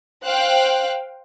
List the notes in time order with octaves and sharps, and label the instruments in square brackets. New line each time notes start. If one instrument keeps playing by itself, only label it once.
[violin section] C5 F5 G5 F#6